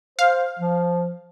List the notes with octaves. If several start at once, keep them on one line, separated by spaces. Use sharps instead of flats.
C5 F5
F3